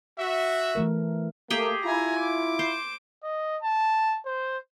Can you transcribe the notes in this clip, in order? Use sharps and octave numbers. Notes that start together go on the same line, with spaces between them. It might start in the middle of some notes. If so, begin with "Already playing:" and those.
F#4 E5
E3 A3 A#4
A3 A#3 G4 G#4 G5
E4 F4 G#5 A#5
D6
C5
D#5
A5
C5